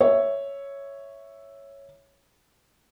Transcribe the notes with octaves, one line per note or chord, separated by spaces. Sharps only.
C#5 E5